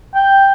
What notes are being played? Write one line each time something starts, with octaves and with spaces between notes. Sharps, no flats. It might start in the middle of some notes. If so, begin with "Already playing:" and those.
G5